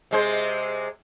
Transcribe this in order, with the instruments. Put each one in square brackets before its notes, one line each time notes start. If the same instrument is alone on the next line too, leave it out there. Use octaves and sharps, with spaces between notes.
[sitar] C3 G#3 C5